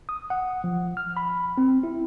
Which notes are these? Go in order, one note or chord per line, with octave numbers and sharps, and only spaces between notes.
D#6
F#5
F3
F6
B5
C4
E4